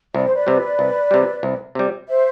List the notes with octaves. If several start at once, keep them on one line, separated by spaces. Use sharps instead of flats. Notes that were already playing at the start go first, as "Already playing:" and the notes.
C2 D5
C5
B4 D5
C3 G3
C2
C3 G3
C2
C3 G3
C5 E5